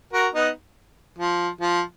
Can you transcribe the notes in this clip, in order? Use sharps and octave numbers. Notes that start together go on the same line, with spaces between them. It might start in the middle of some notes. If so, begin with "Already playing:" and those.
F#4 A#4
B3 D#4
F3
F3